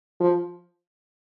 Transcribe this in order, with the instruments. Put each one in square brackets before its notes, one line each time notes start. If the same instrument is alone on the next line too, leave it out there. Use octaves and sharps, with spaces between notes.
[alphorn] F3